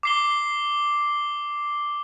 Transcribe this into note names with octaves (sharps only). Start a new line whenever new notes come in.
D6 C7 G7